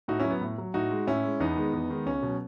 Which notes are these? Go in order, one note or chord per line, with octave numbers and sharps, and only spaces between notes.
A2 D#4 F#4
F#3 C#4 E4
B3
A2
F#3
A2 D#4 F#4
G#3
A2 C#4 E4
G#3
E2 B3 D#4
D#3 G#3
E2
D#3 G#3
C#2 C#4
B2 F#3